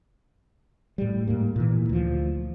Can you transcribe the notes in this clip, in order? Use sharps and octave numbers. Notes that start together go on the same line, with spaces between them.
A2 G3
G#2 A#3
A#2 E3
D2 F3